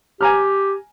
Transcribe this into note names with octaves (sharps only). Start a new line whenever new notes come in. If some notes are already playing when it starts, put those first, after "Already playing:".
G4 G#5 A#5 F6